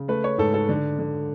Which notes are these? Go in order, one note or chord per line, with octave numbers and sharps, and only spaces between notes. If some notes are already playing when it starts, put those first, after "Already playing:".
Already playing: C#3
A3 B4
C#5
G#2 A4
A4
D3
D3